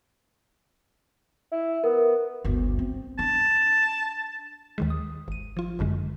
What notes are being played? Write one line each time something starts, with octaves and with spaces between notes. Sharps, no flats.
E4
B3 A#4
G1 D2
C4
D4 A5
D#2 D#3 G#3
D#6
G#1 D#7
F3 F4
G#1 F#2 D3 G#3